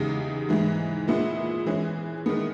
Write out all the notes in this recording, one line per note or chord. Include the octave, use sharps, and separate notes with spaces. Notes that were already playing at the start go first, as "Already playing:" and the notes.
Already playing: E2 C#3 G#3 D#4 G4
G#2 E3 G#3
A#2 G#3 B3 E4
E3 G#3 C#4
D#3 G#3 B3